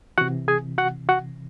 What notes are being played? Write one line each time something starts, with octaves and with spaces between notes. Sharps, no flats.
C3 E3 F#4 F#5
G#4 G#5
F#4 F#5
F#4 F#5